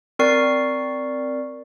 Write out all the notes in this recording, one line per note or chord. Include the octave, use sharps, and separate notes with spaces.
C4 A#4 D5 C#6 C7